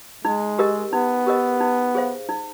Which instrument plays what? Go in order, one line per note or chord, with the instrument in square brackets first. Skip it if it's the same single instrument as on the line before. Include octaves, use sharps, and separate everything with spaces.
[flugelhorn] G#3 [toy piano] D#4
[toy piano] G4 A#4 D#5
[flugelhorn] B3 [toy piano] D#4
[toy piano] G4 A#4 D#5
D#4
G#4 C5 F5
D#4